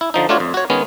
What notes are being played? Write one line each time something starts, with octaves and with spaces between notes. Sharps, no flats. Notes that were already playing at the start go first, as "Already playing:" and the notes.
E4
D3 F3 D#4
A3 D4 F4 F#4 C#5
F2
F#4 C#5
D#3 G#3 B3 C#4